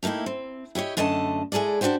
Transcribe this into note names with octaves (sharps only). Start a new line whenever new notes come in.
A3 A#3 D#4 E4 G4
C4
E4 G4 C#5 D#5
F#2 D3 A3 D#5 G#5 A5
G#3 E4 G#4 A4 D5
D4 D#4 F#4 G4 C5